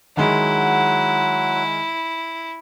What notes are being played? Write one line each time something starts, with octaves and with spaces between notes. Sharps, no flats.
D#3 F#3 G#3 E4 F#5